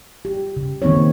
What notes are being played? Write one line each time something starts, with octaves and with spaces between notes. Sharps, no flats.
G4
C#3
D#3 A#3 C4 D#4 C#5